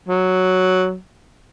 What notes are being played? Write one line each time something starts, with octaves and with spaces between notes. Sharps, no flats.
F#3